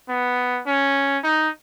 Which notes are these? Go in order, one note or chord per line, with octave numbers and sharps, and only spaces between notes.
B3
C#4
D#4